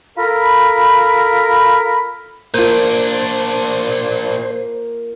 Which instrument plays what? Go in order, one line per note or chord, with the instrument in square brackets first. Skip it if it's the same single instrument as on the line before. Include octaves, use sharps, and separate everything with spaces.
[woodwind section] F4 A4 A#4 B5
[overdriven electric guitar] A#2 D4 [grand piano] A#3 F4 [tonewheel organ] C5